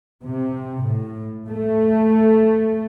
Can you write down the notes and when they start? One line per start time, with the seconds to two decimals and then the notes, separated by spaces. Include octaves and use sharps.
0.24 C3
0.83 A2
1.48 A3